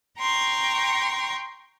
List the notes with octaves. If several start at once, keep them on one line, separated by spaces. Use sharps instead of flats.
G5 A#5 C6 C#6